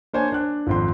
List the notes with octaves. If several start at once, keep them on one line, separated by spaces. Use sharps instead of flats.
A#3 D4 C5 C#5 G#5
D4 F#6
G#1 F2 C6